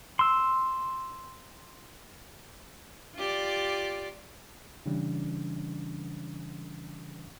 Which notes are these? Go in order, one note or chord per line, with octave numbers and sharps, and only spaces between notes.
C6 E6
F4 G4 D5
C#3 E3 G3 C#4 D4